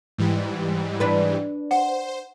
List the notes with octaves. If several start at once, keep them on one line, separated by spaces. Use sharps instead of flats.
G#2 E3 G3
D4 B4
C5 F#5